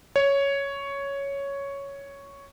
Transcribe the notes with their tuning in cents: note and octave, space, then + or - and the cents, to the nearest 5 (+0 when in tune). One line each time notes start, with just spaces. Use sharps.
C#5 +5